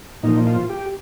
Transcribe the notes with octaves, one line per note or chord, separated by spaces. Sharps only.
A#2 F3 D#4
F4
G4